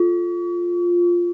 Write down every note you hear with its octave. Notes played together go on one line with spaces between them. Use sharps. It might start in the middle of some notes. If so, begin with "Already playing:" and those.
Already playing: F4